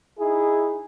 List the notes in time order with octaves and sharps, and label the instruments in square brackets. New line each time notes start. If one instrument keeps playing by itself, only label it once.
[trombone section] D#4 E4 G#4